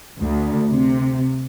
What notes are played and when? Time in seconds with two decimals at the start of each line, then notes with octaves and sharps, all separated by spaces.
0.20 D2
0.68 C3